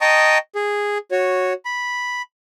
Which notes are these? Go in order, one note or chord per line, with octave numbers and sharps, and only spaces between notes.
D#5 G5 A5 A#5 C#6 D#6
G#4
F#4 C#5
B5